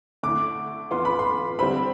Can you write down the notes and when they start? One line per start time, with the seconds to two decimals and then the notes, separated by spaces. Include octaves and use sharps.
0.23 D3 A3 E4 D6
0.91 E3 B3 F4 C6
1.05 B5
1.19 C6
1.59 D3 G3 C4 E4 B5